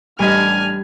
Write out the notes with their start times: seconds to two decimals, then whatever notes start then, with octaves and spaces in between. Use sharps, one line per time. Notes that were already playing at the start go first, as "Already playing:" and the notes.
0.19 A1 G3 D4 D#5 G#5 F6